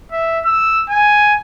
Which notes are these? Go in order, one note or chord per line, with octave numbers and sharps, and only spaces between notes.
E5
E6
G#5